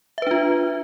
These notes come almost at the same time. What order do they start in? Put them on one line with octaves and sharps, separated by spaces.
E5 B4 D4 F4